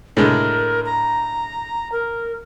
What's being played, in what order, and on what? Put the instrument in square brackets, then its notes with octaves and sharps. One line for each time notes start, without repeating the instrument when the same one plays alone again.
[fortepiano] A2 D3 G#3 [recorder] A#4
[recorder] A#5
A#4